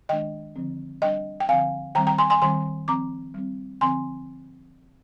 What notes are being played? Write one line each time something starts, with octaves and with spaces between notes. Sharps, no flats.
D#3 G#3 D4 D#5 G5
D3 F3 C4
G3 D4 D#5 G5
G5
D3 F3 C4 F5 G#5
D#3 G3 C4 G5 A#5
G5 A#5
G#5 C6
G#5 C6
D#3 G3 C4 G#5 C6
F3 C4 A#5 D6
G3 C4
D3 F3 C4 G#5 C6